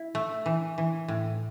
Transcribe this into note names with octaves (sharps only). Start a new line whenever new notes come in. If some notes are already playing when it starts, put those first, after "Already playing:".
Already playing: E4
A3
E3
E3
A2